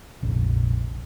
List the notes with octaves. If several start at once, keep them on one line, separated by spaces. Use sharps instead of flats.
F1 A#1